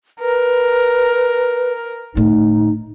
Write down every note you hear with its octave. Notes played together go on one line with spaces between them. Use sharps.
A#4 B4
A2 D3 D#4